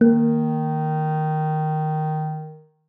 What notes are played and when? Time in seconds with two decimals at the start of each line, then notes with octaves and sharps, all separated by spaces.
0.01 D#3 A#3